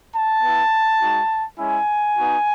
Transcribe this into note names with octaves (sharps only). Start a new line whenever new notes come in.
A5
B3 E4
G#3 D#4 F#4
G#3 C#4 E4 G#5
B3 D#4 F#4